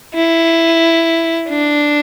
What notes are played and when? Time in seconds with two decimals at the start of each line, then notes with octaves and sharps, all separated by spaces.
0.14 E4
1.49 D4